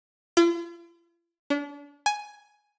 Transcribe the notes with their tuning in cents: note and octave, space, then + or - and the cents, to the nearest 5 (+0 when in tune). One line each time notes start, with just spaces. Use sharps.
F4 -45
D4 -35
G#5 +5